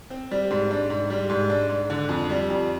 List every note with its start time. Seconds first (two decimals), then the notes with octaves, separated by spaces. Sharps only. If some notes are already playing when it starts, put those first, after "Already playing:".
0.10 C4
0.31 G3
0.50 G#2
0.71 D4
0.90 G#2
1.10 G3
1.30 G#2
1.50 D4
1.69 G#2
1.90 D3
2.09 F2
2.30 G3
2.50 F2